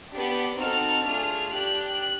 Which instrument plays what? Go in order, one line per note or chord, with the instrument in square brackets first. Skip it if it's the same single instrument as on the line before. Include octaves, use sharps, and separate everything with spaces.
[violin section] B3 D4 G4
C4 D#4 F#4 A4 F6
A3 D4 F4 G#4 F6
D4 G4 F#6